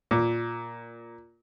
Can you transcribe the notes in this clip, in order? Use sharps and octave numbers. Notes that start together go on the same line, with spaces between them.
A#2